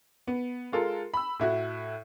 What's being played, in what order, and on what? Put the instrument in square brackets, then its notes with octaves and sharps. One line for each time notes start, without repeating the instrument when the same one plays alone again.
[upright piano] B3
G#3 F4 A4 A#4
B5 E6
A2 E4 F#4